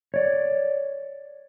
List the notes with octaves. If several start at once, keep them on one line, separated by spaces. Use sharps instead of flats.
C#5 D5